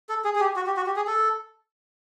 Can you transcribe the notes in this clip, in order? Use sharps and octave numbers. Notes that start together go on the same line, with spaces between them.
A4
G#4
G#4
G4
F#4
G4
F#4
G4
G#4
A4